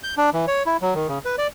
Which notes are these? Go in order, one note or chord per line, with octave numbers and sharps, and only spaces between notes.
G6
D4
E3
C#5
E4
F#3
D#3
C#3
B4
D5